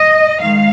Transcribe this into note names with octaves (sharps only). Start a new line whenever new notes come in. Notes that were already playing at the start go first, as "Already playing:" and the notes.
Already playing: D#5
D#3 G#3 F5